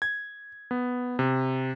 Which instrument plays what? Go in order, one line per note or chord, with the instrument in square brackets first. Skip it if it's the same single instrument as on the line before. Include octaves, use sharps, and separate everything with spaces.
[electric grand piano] G#6
B3
C3